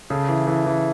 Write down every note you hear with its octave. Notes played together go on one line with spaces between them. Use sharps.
C#3 A4
E3
E3 A4
E3